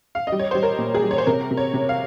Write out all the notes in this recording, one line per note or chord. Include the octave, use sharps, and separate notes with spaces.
F5
D#5
G3
C#5
G3 C5
A#4
A#2
G#4
G3
C#5
C5
C3 A#4
C3
C#5
C3
F5